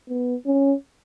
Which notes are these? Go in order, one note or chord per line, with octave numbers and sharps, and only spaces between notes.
B3
C#4